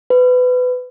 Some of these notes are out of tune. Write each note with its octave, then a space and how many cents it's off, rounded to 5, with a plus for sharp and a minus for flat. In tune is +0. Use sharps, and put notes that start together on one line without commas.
B4 +25